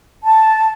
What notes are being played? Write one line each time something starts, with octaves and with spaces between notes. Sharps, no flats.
A5